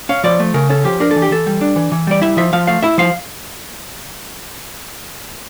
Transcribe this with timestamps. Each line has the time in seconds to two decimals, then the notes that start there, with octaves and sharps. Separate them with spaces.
0.09 C#4 F5
0.24 F3 D5
0.40 A3
0.54 C#3 A#4
0.69 C#4 A4
0.84 F3 G4
1.00 D4 A#4
1.11 A4
1.16 E3
1.22 G4
1.31 E3 A4
1.46 G3
1.61 D4
1.76 E3
1.92 E3
2.07 G3 D5
2.22 E4 E5
2.37 F3 E5
2.53 F3 F5
2.67 A3 F5
2.83 E4 E5
2.98 F3 F5